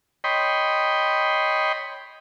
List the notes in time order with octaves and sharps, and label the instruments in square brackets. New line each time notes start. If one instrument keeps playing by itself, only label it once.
[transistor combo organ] C#5 D#5 G5 B5 C6